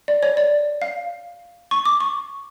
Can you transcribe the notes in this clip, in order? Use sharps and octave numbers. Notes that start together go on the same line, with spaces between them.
D5
C#5
D5
F5
C#6
D6
C#6